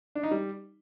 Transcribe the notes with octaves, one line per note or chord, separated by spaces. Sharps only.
D4
D#4
G3